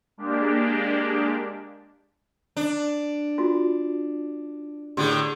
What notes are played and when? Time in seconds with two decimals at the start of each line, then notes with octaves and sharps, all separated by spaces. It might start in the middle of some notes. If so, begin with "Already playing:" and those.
0.17 G#3 A#3 D4 G4
2.57 D4
3.38 F4 F#4
4.97 A2 D3 G4 G#4